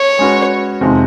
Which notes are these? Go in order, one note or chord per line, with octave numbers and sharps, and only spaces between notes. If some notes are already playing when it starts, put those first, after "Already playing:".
Already playing: C#5
G#3 C#4 F#4 B4
F2 C3 D#3 G#3